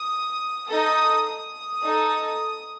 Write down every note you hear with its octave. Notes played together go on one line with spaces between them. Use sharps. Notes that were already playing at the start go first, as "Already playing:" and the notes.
Already playing: D#6
D#4 A4 D#6
D#6
D#4 A4